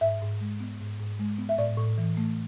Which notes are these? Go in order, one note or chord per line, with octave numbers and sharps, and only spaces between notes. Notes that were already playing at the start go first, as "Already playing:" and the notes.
G#2 E5
G#2
G#3
B3
G#2
G#2
G#3
B3
E5
A2 D5
A2
E3
A3